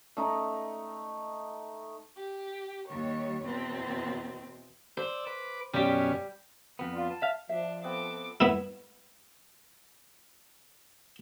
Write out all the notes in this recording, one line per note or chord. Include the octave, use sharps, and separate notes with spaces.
A3 D#4
G4
D#2 G3 C#5
E2 B2 C4
C5 D5 E6
B4 D6
F#2 B2 G3 C#4 G4
F2 B3
F4 D5
A5
E5 F5
F3 D4 E5
B3 C4 A4 B4 D6
B3 E4